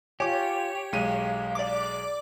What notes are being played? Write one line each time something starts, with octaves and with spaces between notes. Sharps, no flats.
F4 G4 C#5 G#5 D6
B1 G#3 F5 D#7
D5 D6